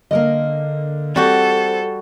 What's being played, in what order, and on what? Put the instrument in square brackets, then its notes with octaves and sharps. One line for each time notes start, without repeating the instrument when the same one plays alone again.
[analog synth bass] D3 [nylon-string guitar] A#3 A#4 D#5
[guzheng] G3 F#4 G4 [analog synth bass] C4 [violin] A4